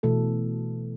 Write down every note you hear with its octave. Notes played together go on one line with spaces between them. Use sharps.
B2 E3 A3 A4